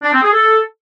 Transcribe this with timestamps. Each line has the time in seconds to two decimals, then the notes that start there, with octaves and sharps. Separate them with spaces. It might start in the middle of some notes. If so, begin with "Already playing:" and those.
0.03 D4
0.13 C4
0.23 G#4
0.33 A4